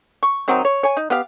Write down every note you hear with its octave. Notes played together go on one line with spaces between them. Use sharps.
C#6
D#3 F#3 C4 D#4
C#5
C#5 G#5
D#4
B3 G4 F5